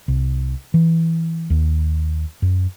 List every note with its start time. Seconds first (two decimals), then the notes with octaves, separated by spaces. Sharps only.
0.08 C2
0.74 E3
1.50 D#2
2.42 F#2